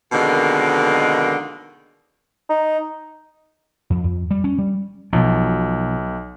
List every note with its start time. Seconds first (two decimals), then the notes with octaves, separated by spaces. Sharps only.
0.12 F2 B2 D3 D#3 G#3 A#3
2.49 D#4
3.90 F2
4.04 F2
4.31 G3
4.44 C#4
4.58 G3
5.13 B1 B2 F3